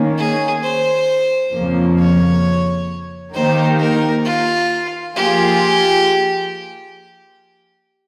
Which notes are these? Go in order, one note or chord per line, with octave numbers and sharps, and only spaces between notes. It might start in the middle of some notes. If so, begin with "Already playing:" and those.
Already playing: D#3 A#3 C#4
G#4
C5
F2 C#3 F3 A#3
C#5
D#3 A#3 D#4 G4 C5
A#4
F4
F3 A#3 F4 G4 G#4